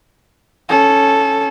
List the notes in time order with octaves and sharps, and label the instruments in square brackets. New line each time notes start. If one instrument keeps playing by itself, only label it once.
[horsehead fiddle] C#4 A4